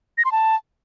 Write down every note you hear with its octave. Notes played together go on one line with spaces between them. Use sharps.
A#6
C6
A5